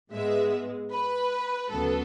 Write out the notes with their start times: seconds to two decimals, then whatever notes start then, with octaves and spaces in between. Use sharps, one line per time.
0.12 G#2 G#3 B3 E5
0.91 B4
1.71 D2 C#3 F#3 B3 A4